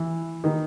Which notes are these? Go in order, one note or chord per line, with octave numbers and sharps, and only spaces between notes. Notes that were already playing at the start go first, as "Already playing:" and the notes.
Already playing: E3
D#3